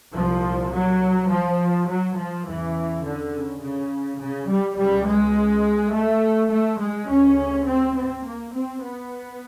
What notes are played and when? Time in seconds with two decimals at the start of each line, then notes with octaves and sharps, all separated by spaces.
0.14 C2 A#2 F3
0.72 F#3
1.30 F3
1.89 F#3
2.17 F3
2.46 E2 C#3 E3
3.03 D3
3.32 C#3
3.61 C#3
4.20 C#3
4.48 G3
4.77 C#2 B2 G3
5.06 G#3
5.93 A3
6.50 A3
6.79 G#3
7.08 D2 C#3 C#4
7.66 C4
7.95 C4
8.25 A#3
8.53 C4
8.82 B3